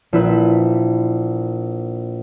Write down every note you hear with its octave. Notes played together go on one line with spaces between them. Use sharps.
A#1 E4 B4